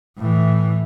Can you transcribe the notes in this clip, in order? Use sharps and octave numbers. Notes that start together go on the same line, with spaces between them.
A2 E3